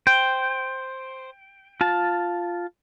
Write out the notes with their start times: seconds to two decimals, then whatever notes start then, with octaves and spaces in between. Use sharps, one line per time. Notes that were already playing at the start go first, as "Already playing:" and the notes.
0.07 C5 G5
1.81 F4 A5